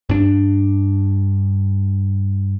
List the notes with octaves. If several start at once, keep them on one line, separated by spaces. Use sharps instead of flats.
G2 D4